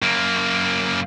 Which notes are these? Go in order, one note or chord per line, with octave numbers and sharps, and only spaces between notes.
F#2 A#3